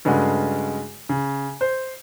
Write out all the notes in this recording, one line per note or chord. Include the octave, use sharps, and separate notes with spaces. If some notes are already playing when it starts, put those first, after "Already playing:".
G2 C#3 G#3 A3 F#4
C#3
C5